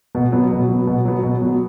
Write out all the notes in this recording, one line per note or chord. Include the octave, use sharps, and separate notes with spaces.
B2
F#3 B3
B2
F#3 B3
B2
F#3 B3
B2
F#3 B3